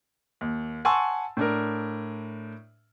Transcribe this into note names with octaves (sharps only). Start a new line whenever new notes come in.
D#2
F#5 G#5 A5 C6 C#6 E6
A2 D4 A#4